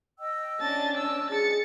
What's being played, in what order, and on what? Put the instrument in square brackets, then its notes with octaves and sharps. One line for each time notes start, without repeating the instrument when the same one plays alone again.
[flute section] D#5 G5 E6
[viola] C#4 D4 [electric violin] A5 A6
[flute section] D5 D#5 [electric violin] A5 E6
[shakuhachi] G#4 [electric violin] A6 C#7